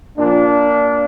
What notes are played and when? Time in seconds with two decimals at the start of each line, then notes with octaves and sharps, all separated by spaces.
0.17 A#2 F3 A#3 D4